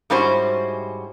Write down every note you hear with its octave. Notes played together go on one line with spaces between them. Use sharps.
G#2 G3 C#4 E4 F#4 C5